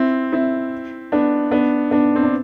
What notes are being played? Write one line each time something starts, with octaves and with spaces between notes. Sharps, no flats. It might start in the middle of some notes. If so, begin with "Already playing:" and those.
Already playing: C4 E4
C4 E4
B3 D4
B3 D4
B3 D4
C4
D4